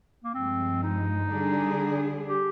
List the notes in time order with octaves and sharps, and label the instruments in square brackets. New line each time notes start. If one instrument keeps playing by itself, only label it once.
[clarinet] A#3
[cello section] G2 F3 G#3 [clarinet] C4
[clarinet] D#4
[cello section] D3 G3 D4 G#4
[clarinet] G4